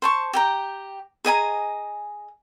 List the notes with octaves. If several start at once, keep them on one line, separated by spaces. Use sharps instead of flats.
C5 A5 C#6
G4 G5 A#5
G#4 D#5 G#5 A#5